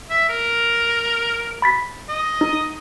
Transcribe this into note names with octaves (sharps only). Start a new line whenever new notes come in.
E5
A#4
B5 A6 B6
D#5
D#4